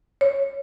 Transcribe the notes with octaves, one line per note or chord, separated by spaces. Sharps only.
C#5